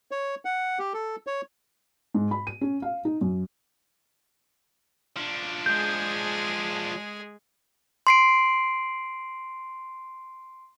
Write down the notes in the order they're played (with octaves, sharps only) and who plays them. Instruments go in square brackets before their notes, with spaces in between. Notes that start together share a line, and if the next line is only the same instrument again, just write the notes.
[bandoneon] C#5
F#5
G4
A4
C#5
[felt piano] G#2
B5
D#7
C#4
F5
D#4
F#2
[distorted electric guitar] F3 D4
[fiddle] G#3 G#4 [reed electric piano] G6
[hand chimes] C6 C7 D7